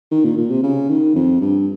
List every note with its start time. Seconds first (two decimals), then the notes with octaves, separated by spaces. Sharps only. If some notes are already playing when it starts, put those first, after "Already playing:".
0.11 D#3
0.24 A#2
0.37 A#2
0.50 C3
0.63 C#3
0.89 D#3
1.15 F2
1.41 G2